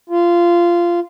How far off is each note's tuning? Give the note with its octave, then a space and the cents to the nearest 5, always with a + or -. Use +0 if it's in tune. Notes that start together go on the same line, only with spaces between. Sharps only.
F4 -15